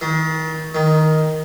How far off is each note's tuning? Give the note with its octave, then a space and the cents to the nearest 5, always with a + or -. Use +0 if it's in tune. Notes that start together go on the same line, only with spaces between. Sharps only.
D#3 +35
D#3 +5